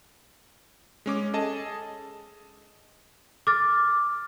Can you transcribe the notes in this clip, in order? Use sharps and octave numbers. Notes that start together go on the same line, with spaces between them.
G#3 C#4 D6
G#4 A4 D#5 A5
D6 F6 A6